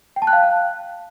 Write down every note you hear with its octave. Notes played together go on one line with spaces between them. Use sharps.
G5
A5
F#6
F5